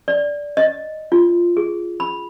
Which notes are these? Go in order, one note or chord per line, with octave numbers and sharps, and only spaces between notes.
D5
D#5
F4
G#4
B5